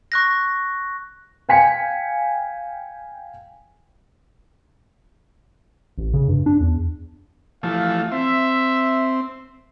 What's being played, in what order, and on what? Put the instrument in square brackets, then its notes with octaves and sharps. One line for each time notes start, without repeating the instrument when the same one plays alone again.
[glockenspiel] C#6 F#6 A#6
[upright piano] F5 G5 G#5 B6 C#7
[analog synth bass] A1
C#3
G2
D4
E2
[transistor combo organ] E3 F3 A3 [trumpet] F5
[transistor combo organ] C4 [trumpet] E5